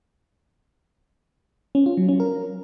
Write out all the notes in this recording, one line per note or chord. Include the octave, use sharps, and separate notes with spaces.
C#4
F4
F#3
C#4
A#4